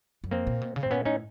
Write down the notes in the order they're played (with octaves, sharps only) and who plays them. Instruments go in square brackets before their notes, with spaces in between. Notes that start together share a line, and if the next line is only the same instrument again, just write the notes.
[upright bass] F#2
[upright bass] F2 [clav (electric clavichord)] A#3 C4
[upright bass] A#2
B2
C#3
[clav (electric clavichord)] C4
[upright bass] A2
[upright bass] A#2 [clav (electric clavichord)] B3 C#4
[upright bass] A2 [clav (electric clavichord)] C#4 D#4